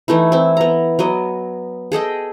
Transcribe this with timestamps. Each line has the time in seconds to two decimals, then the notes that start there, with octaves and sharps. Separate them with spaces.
0.08 E3 A3 D#4 E4
0.32 C4 E4
0.57 B3 A#5
0.99 F#3 B3 D#5
1.92 G#4 A4 D#5 G5